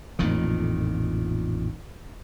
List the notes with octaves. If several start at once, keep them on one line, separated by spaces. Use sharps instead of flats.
A1 F2 A#2 D#3